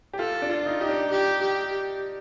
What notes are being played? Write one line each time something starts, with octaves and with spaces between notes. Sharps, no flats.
G4
F4 A4
D4
F4
D#4
D#4 G4
D4
G4
G4